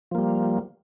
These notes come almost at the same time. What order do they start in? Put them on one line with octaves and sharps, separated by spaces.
F3 A#3 G3